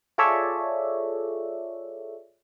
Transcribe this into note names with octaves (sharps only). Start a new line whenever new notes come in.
F4 G#4 A4 C#5 D5 E5